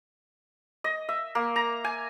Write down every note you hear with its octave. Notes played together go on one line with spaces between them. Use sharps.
D#5
E5
A#3
A#5
G#5